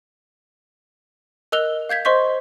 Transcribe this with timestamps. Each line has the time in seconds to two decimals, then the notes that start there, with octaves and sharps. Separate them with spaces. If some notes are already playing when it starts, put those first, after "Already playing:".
1.52 A#4 D#5 E6 F#6 F7 G7
1.89 F5 G6 G#6 B6
2.05 C5 D#5 C6 C#6 G6 B6